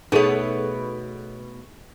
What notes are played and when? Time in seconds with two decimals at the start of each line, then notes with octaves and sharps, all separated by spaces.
0.12 B2 A3 B3 D#4 G#4 A4 C#5